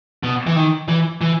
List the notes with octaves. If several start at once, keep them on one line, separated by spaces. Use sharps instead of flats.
B2
E3
D#3
E3
E3